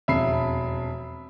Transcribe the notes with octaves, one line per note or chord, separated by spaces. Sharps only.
E1 F2 E5 B5 C7